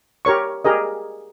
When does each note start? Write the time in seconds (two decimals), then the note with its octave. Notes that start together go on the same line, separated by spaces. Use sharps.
0.25 G4 A#4 C#5 C#6
0.65 G4 G#4 A#4 D#5